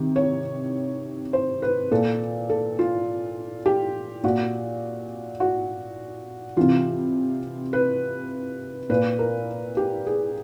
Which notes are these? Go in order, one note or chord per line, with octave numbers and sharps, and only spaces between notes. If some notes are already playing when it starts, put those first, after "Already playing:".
Already playing: C3 D#3
C#5
C5
B4
A#2 A4
A4
F4
G4
A#2 F#4
F#4
C3 E3 F4
B4
A#2 B4
A#4
G4
G#4